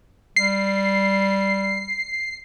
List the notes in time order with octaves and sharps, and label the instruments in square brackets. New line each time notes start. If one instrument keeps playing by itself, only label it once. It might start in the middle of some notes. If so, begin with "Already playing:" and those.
[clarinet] G3 [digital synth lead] C7